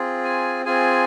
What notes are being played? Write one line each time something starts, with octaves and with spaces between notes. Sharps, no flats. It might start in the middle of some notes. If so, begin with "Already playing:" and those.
Already playing: C4 F4 G#4
G#5
C4 F4 G#4 G#5